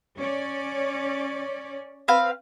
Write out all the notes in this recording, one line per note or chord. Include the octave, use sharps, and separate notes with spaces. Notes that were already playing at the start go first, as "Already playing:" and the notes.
C#4 C#5 D5
C4 B4 F5